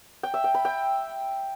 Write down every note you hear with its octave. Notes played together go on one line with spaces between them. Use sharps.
G5
E5
G5
B5
G5